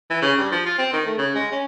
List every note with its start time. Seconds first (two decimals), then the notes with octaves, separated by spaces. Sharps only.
0.10 E3
0.22 C#3
0.38 G2
0.52 F3
0.66 F4
0.78 C4
0.93 D#3
1.06 A3
1.18 C#3
1.35 G#3
1.52 C#4